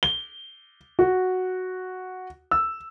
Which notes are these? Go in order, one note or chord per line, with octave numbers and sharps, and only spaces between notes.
G7
F#4
E6